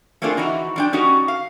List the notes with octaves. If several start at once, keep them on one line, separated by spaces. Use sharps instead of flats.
A3 A#3 C4 D4 F4 G#4
E3 D#4 E4 F#4
F3 D4 G5
G3 C#4 D#4 F#4
F5